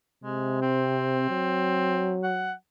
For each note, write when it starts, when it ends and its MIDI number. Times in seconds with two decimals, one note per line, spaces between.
0.24 1.27 48
0.24 0.61 56
0.62 2.17 60
1.30 2.56 54
2.23 2.52 78